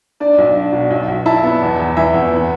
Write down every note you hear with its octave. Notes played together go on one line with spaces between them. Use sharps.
D4 D5
B1
D4
B2
B1
B1
E4 E5 A5
B3
E2
E2
E3 E5
E2
B3